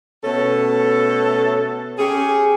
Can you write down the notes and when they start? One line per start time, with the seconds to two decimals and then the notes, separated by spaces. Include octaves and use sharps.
0.23 B2 A3 C#4 A4
1.98 C#4 G4 G#4